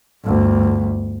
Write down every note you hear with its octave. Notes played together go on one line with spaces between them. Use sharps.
G1 D2